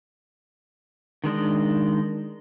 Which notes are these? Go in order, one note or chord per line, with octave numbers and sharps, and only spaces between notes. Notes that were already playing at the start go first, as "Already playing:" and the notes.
D#3 G#3 D4 D#5